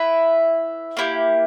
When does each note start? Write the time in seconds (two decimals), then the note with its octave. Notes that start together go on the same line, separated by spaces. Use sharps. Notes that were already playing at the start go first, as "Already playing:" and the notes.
Already playing: E4 B4 E5
0.97 A#3 E4 G4